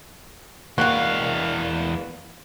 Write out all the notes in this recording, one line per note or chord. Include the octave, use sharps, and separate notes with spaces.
E2 G3 A#3 F#4 F5